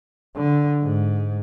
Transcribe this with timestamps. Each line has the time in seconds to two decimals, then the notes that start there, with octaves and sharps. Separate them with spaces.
0.36 D3
0.82 G#2